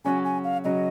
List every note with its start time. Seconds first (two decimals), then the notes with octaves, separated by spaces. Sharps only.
0.04 C#3 F#3 C#4 F#4 G#5
0.24 G#5
0.44 F5
0.64 C#3 F#3 C#4 F#4 D#5